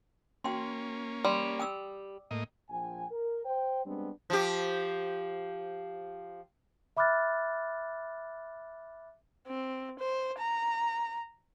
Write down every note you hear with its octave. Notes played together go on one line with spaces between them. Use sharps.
A#3 C#4 F#4 G5 C6
G3 C6
G5 D#6 E6
A2 A#3 D#5
A#1 F3 G5 G#5
A#4
C5 G5
G3 G#3 B3 C4 D4
F3 G4
E5 B5 D6 F6 F#6 A6
C4
C5
A#5